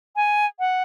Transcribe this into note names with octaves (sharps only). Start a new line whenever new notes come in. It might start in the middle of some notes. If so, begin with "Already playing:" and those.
G#5
F#5